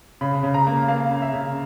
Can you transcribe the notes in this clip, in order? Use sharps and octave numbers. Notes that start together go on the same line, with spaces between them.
C#3 B5
C#3
A#5
A#3
A#3 F5
C#3
E5
C#3